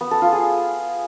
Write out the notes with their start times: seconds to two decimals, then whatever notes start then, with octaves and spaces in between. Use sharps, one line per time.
0.01 B3
0.11 A4
0.22 F4
0.32 G#4